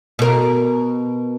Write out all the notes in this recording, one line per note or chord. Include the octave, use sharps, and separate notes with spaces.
B2 A#4